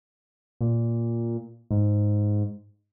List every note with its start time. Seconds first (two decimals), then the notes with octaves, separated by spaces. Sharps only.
0.61 A#2
1.71 G#2